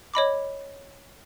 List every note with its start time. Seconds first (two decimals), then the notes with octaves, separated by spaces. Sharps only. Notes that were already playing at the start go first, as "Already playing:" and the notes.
0.14 C#5 D#5 B5 D6